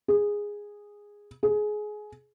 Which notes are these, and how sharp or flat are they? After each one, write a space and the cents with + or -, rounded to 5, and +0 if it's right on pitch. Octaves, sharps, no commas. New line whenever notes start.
G#4 -10
G#4 +20